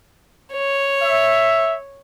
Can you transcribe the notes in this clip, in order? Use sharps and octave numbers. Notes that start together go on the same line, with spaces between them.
C#5
E5